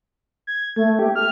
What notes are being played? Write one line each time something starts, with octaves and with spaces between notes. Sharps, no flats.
G#6
A3
G4
F6